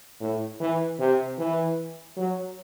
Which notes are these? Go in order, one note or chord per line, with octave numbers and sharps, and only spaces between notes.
A2
E3
C3
E3
F#3